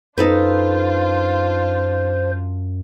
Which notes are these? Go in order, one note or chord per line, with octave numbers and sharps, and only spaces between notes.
F#2 D4 D#4 F4 A4 B4 C5